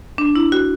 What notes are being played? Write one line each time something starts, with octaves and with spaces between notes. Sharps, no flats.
D4
E4
F#4